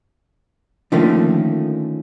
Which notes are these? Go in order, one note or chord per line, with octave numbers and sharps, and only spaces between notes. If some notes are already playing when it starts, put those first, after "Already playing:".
D3 D#3 F3 A3 A#3 C#4